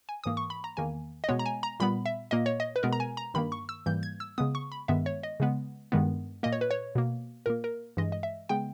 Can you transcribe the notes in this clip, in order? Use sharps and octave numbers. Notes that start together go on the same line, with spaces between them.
G#5
G#2 E3 A#3 D#6
C#6
B5
A#5
E2 D#3 A#3 G#5
D#5
B2 G#3 B3 C#5
A#5
G#5
A#5
A#2 G3 B3 B5
E5
A#2 A#3 D#5
C#5
D#5
B4
B2 G#3 B3 A#4
A#5
G#5
A#5
G2 D#3 A#3 B5
C#6
E6
G#2 E3 G3 A#3 G6
G#6
E6
C#3 G#3 B3 D#6
C#6
B5
G2 D#3 G#3 B3 E5
C#5
D#5
C#3 G#3 B3
G2 D#3 G#3 B3
A#2 A#3 D#5
C#5
B4
C#5
B2 A#3
A#2 A#3 A#4
A#4
G2 E3 G#3 D#5
D#5
E5
C#3 G#3 B3 G5